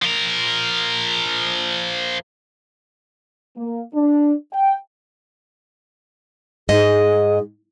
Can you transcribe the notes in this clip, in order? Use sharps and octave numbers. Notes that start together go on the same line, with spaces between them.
F3 A#4
A#3
D4
G5
G#2 G#4 D#5